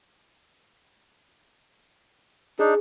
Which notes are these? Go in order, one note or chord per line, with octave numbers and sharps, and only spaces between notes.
D4 D#4 G#4